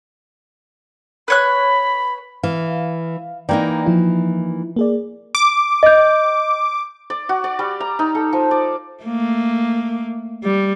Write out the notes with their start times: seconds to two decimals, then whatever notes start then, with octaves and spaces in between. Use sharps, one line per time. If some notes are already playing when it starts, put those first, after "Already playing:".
1.28 B4 C#5 B5 F#6
2.43 E3 F5
3.49 E3 A#3 D#4 D5 G5 A#5
3.86 F3 E4
4.76 A#3 G#4 D5
5.35 D6
5.83 D#5 G6
7.10 D5
7.29 F#4
7.44 D5
7.59 G3
7.80 A#5
7.99 D#4
8.15 A4
8.33 F3
8.51 D5
9.04 A3 A#3
10.44 G3